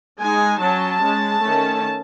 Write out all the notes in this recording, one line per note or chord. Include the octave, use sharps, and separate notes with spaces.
G#3 D#4 G#5
F#3 C#4 A5
G#3 C#4
D#3 A3 C#4